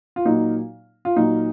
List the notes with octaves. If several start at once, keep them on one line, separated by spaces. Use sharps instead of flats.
F4
A#2 F#3 A#3 D#4
F4
A#2 F#3 A#3 D#4